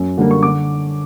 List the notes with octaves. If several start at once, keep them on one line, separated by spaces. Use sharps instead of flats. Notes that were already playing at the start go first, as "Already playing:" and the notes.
Already playing: F#2
D3 G3 A#3
C#6
D3 D6